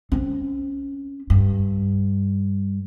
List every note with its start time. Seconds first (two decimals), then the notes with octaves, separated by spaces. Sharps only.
0.12 C4 C#4
1.30 G2